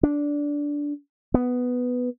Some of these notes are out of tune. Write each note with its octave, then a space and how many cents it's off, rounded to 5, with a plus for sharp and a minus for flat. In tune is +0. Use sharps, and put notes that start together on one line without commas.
D4 -10
B3 +5